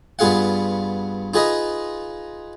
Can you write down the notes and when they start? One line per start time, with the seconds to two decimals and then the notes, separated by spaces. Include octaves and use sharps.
0.19 G2 B3 F4 G#4 F5 F#5
1.34 D#4 F4 G#4 B4 D#5